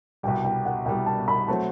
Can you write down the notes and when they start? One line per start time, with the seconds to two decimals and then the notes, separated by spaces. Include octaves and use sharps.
0.23 C2 B2 G3 G5
0.45 G5
0.65 F#5
0.86 C2 B2 G3 G5
1.06 A5
1.28 B5
1.48 F#3 A3 C4 F#4 A5